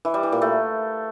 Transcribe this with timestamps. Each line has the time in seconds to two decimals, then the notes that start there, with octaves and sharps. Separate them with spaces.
0.05 E3
0.14 G3
0.23 E3
0.32 A#2
0.42 A3